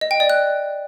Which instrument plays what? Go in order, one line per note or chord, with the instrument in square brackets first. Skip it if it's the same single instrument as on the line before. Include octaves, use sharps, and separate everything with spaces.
[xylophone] D#5
G5
D5
F#6